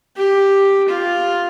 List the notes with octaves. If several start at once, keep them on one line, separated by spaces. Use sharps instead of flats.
G4
F4